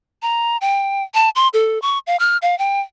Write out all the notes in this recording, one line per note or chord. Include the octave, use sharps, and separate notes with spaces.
A#5
G5
A5
C6
A4
C#6
F5
F6
F5
G5